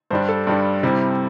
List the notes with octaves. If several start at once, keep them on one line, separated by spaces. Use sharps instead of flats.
G2 G3 D4 C5
A4
G2 G3 D4
C3 G3 C4 E4